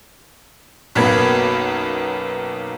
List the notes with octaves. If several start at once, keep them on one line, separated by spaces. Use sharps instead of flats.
B1 F#2 A#3 B3 B5 G#6